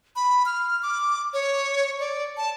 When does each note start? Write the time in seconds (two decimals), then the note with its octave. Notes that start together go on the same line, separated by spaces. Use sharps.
0.16 B5
0.46 F6
0.83 D6
1.33 C#5
2.00 D5
2.37 A5